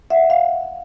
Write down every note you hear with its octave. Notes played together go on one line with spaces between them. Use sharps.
E5 F#5
F5